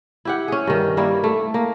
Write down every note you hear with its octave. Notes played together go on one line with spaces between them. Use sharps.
E4 G4 F#5
C#4 G#4
G2 D#3
G3 A#3 E4
A3
A#3